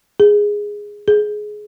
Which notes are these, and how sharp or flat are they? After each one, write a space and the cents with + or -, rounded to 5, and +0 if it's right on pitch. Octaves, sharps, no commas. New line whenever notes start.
G#4 -5
G#4 +15